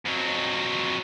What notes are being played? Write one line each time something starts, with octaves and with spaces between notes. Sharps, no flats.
F2 F#3